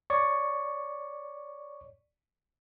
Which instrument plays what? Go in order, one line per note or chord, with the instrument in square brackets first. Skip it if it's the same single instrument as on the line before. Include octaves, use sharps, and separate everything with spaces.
[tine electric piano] C#5 D5 C#6